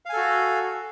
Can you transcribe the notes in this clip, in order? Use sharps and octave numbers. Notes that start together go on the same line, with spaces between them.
F#4 A4 F5 G#5